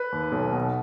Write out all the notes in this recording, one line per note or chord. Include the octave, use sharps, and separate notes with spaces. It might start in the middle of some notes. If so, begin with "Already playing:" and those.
Already playing: B4
D#2
B1
B2